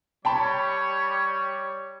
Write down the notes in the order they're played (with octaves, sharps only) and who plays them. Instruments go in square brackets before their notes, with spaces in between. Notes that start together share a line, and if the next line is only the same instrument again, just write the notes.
[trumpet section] G3 C#5 [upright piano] G5 A5 B5